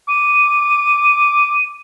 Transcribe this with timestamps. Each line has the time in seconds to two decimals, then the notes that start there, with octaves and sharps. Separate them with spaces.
0.08 D6 D#7